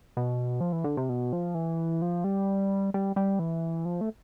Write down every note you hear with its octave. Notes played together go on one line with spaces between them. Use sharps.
B2
F3
E3
D3
C3
B2
F3
E3
F3
G3
G3
G3
E3
F3
A3